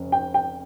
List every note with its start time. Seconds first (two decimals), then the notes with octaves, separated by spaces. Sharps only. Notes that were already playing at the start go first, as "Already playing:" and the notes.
Already playing: F1 C#3
0.12 G5
0.34 G5